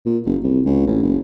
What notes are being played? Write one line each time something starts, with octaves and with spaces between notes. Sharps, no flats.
A#2
F#1
C2
C#2
A1
F#1